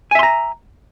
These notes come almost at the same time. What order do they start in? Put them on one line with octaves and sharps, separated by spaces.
G#5 E5 C6 A#5